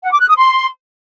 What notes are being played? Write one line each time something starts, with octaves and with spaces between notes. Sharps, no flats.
F#5
D6
F#6
D#6
C6